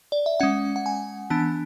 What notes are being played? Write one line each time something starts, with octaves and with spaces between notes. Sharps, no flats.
D5
E5
G#3 C#4 F#5
F#5
G#5
E3 B3 D4 A5